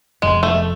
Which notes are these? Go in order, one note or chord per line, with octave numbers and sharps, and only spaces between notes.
F1 F2 F3 G#3 B3
A3